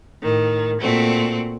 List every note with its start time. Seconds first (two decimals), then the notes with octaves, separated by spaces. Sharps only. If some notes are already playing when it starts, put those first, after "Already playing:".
0.22 A2 D#3
0.81 A#2 A3 C4 F#4